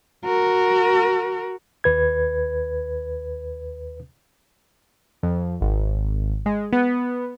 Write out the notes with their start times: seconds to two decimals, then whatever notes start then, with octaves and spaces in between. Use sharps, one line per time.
0.25 F#4 A#4
1.84 D#2 B4 G#6
5.23 F2
5.61 G#1
6.46 G#3
6.73 B3